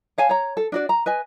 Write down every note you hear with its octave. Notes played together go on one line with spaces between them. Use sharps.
C#5 F5 G#5 A5
C#5 A#5
A4
D4 F#4 D5
A#5
B4 D#5 G#5